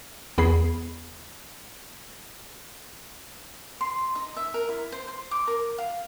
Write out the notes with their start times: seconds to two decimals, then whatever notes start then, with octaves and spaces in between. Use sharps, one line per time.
0.38 E2 B3 G#4 B5 C7
3.81 C6
4.15 D#4
4.37 E5
4.54 A#4
4.69 E4
4.92 C5
5.08 C5
5.31 D6
5.47 A#4
5.78 F5